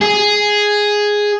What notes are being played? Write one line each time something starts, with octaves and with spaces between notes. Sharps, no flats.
G#4